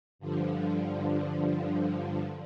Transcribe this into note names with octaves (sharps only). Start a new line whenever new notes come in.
G2 D3 F3